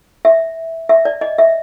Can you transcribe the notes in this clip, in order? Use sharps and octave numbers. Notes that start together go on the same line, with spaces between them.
E5
E5
D5
D#5
E5